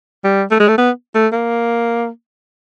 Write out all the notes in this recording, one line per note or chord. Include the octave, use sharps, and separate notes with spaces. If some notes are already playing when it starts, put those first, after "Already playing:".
G3
A3
G#3
A3
B3
A3
A#3